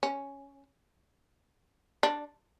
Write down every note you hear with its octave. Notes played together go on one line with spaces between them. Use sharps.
C#4
D4